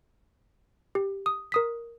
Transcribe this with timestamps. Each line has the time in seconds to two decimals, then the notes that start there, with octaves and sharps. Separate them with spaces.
0.95 G4
1.26 D#6
1.52 A#4 D#6 B6